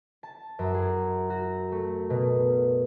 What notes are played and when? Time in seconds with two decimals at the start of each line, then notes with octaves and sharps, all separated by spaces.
0.23 A5
0.59 F#2
0.74 G#4
1.30 F#4
1.72 A3
2.10 B2